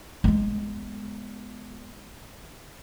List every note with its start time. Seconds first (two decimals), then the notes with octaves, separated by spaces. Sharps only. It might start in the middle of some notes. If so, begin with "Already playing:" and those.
0.24 G#3 B3